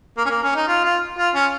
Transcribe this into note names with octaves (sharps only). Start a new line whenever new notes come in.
A#3
C#4
A#3
C#4
D#4
F4
F4
F4
C#4